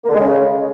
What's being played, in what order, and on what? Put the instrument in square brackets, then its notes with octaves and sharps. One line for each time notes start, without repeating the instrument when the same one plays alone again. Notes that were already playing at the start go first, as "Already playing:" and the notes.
[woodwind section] A#3
D3
G#3
C#3